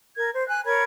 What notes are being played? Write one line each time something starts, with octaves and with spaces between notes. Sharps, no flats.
A#4 G#6
C5
G#5 F#6
A#4 C#5 B5 G#6